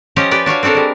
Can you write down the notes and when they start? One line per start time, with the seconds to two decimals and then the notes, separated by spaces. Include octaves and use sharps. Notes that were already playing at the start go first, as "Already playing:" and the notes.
0.16 F3 C#4 F4 G4 D#5 F5
0.31 G4 B4 D5
0.46 D4 F#4 C#5 F5
0.63 C4 D4 F#4 A4 A#4
0.75 G3 G#3